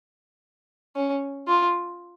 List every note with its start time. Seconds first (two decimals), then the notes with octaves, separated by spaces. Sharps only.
0.96 C#4
1.48 F4